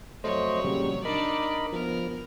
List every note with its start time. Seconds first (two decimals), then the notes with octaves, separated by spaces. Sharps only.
0.24 F2 F#3 A3 C5 C#5 D#5
0.64 A#2 C#3 G3
1.05 D4 D#4 A#4 D5 D#5 B5
1.73 F3 B3 A#4